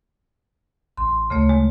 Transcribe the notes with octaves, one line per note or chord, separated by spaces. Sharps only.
A1 C6
D2 C#3 A3 C#5
G#3